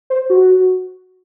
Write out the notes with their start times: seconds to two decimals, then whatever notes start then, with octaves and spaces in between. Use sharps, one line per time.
0.10 C5
0.30 F#4